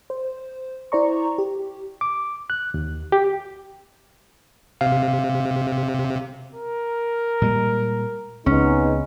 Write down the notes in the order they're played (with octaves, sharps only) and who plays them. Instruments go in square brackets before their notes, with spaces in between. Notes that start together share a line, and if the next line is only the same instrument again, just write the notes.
[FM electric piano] C5
E4 C5 D5 A#5 C#6
G4
[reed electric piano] D6
F#6
D#2
G4
[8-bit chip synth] C3 [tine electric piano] F5
[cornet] A#4
[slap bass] A#2 G3 G#3
[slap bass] C#2 [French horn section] G#3 B3 D#4 [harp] C#4